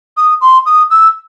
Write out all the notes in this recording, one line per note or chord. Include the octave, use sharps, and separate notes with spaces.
D#6
C6
D#6
E6